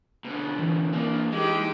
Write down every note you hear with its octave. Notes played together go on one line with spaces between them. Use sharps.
B2 D3
E3
A#3 D4
G#3 D#4 E4 G4